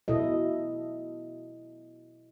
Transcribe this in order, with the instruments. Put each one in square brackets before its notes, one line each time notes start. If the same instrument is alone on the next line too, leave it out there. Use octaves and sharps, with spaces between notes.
[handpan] B2 E4 A4 D#5